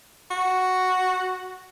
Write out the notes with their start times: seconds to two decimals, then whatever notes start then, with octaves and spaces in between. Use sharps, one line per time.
0.31 F#4